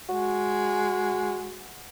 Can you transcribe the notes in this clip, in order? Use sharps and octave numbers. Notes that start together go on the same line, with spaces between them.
G#3 F#4